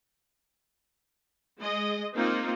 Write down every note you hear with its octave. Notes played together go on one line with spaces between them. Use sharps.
G#3 D#5
A#3 C4 D#4 F4